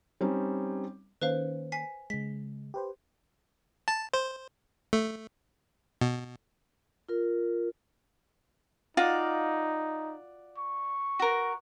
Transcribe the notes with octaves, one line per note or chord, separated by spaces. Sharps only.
G3 C4 C#4 D#4
D#3 A#3 C#4 B4 C5 F5
G#5 B6 C7
C#3 G#3 B6
G4 B4 C5
A5
C5
A3
B2
F4 A#4
D#4 F4 F#4 D5 F5
C#6
F#4 A#4